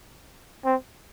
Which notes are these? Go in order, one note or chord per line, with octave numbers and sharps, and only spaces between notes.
C4